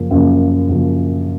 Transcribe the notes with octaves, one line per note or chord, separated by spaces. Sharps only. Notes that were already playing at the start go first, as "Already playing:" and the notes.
Already playing: F#2 C#3 F3 A#3
F#2 C#3 F3 A#3
F#2 C#3 F3 A#3